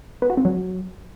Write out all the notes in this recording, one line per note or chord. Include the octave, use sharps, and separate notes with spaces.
B3
F#4
C4
F#3